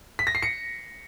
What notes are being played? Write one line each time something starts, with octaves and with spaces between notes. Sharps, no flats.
B6
A#6
C7
C#7